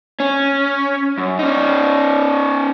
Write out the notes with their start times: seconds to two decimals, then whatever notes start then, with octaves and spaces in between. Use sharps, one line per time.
0.20 C#4
1.18 F#2
1.39 C#4 D#4